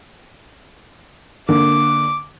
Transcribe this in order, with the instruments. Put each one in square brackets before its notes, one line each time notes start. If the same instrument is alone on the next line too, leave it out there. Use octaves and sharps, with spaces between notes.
[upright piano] D3 A#3 [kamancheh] D6